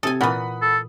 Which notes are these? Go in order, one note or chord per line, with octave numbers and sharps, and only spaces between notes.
C3 A4 G#5 D#6
A#2 E3 F#5 B5 D#6
A4